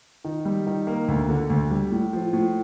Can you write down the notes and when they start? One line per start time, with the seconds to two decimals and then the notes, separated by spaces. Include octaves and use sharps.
0.24 D#3
0.45 G3
0.67 D#3
0.87 A#3
1.08 D2
1.29 D3
1.50 D2
1.71 G3
1.91 A2
2.13 F3
2.33 A2